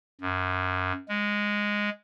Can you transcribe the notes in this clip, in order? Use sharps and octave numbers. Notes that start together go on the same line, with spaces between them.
F#2
G#3